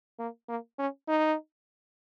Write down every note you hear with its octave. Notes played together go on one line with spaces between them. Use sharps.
A#3
A#3
C#4
D#4